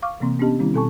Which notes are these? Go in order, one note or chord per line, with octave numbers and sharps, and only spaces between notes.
F5 C#6 D6 F6
C3 E3 A#3 C4 C6
B3 C#4 D4 G4 D#5 A5
D#3 G3 C4 C#4 E4
B2 C4 A4 G#5 A5 C#6